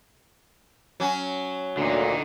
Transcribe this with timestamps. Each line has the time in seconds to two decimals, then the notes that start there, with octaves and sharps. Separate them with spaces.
1.00 F#3 C#4
1.77 D2 A#2 D3 D#4